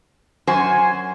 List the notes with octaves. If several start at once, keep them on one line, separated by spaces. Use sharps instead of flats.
F#2 F#4 C5 G#5